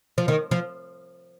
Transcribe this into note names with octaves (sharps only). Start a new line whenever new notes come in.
F3
D#3
F3